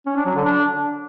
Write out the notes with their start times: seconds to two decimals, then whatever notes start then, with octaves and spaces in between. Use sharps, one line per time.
0.06 C#4
0.16 D4
0.26 F#3
0.35 D3
0.45 D4